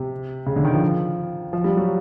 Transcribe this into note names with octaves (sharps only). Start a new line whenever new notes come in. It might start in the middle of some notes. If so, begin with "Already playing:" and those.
Already playing: C3
C#3
D3
D#3
F3
F3
G3
F#3